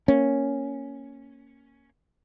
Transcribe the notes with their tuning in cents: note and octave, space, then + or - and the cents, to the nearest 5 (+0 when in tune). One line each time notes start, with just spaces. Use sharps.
A#3 +0 C#4 +0